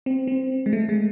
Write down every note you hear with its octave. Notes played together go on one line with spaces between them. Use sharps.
C4
C4
G#3
A3
G#3